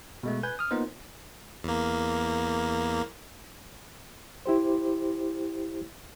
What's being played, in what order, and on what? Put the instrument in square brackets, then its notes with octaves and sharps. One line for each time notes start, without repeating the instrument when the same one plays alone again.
[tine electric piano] B2 G#3 A3
B4 G#5 G6
D#6 F6
A#3 B3 D#4 F4 C5
[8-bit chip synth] E2 A#3
[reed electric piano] E4 G4 C5